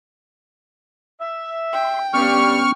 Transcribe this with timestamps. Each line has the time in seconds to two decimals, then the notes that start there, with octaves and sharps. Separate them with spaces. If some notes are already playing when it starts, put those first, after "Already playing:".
1.20 E5
1.73 G5 C6
2.14 G2 G3 B3 C#4 C#6 F6